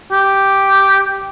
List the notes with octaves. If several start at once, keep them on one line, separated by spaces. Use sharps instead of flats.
G4